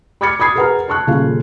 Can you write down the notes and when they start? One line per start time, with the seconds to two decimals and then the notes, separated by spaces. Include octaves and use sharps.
0.21 B5 D6 F6 G#6 A6 C#7
0.40 B5 D#6 G#6 C7
0.55 G#4 A#4 B4 F#5 A#5 F6
0.88 A5 C#6 F#6
1.07 D#1 C#3 F4 F5